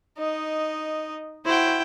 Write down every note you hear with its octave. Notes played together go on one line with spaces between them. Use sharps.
D#4 D#5
E4 F#4 C5 G5